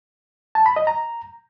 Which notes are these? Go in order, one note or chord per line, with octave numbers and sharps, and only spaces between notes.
A5
B5
D#5
A#5